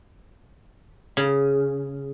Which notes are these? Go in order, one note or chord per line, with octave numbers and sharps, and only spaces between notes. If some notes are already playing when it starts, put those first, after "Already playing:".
C#3